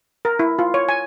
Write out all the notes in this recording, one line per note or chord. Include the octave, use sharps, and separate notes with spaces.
A#4
E4
F4
C#5
G#5